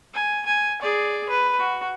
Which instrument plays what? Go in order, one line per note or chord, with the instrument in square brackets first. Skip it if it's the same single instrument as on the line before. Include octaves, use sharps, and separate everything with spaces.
[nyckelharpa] G#5
G#5
G#4 D5
B4
F#4